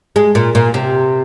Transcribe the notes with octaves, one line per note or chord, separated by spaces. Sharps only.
G#3
A#2
A#2
C3